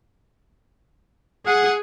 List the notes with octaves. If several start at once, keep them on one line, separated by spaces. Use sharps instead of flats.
G#4 F#5